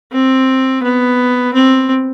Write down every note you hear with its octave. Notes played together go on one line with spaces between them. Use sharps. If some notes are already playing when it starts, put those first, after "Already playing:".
C4
B3
C4